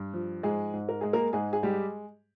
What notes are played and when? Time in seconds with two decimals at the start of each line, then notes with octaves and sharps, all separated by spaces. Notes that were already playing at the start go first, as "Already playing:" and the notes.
Already playing: G2
0.14 F3
0.43 G#2 G#3 G#4
0.73 G#2
0.89 A#4
1.01 G#3 G#4
1.13 A#3 A#4
1.33 G#2 G#3 G#4
1.53 G#4
1.63 G3 G#3 G4